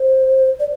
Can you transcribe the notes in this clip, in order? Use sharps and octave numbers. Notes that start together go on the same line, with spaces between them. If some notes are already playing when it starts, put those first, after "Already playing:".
Already playing: C5
D5